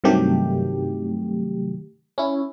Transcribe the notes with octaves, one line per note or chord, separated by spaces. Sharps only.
G2 C3 D#3 F#3 A3 G4
C#4 E4